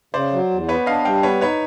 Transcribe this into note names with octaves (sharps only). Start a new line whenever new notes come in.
C#3 C5 D5
F#3
E2
B3 B4 C#5
D4 D#5 F5
G3 F5 G5
B3 B4 C#5
D#4 B4 C#5